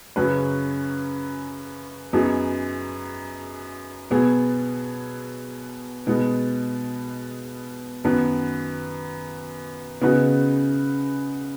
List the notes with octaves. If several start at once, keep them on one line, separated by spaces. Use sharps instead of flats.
F#2 C#3 F#3 C#4 B4
F#2 F#3 B3 D#4 G#4
B2 F#3 B3 G#4
B2 G#3 B3 D#4
F#2 D#3 B3 F#4 B4
C#3 B3 D#4 F#4 B4